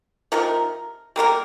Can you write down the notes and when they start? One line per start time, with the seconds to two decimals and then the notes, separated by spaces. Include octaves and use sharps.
0.32 C3 F3 D#4 A#4
1.16 G3 A#3 F4 A#4